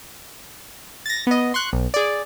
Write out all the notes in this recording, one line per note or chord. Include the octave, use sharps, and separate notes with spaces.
A6 A#6
B3 D#5
C6 C#6 F#6
B1
G#4 D5